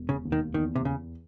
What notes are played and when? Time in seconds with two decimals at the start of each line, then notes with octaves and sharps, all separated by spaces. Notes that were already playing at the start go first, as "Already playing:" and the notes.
Already playing: E1
0.09 C#3
0.25 D#2
0.32 D#3
0.54 E2 D#3
0.75 C3
0.85 E2 C#3